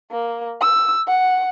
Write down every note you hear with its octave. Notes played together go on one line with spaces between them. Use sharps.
A#3
E6
F#5